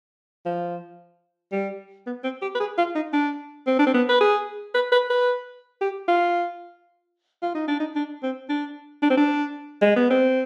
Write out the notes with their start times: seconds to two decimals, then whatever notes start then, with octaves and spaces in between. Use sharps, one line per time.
0.46 F3
1.52 G3
2.07 B3
2.24 C4
2.42 G4
2.55 B4
2.60 G#4
2.78 F4
2.95 D#4
3.13 D4
3.67 C4
3.79 D4
3.87 C4
3.94 B3
4.09 B4
4.21 G#4
4.75 B4
4.92 B4
5.10 B4
5.81 G4
6.08 F4
7.42 F4
7.55 D#4
7.68 D4
7.80 D#4
7.96 D4
8.23 C4
8.50 D4
9.03 D4
9.10 C4
9.17 D4
9.82 G#3
9.96 B3
10.10 C4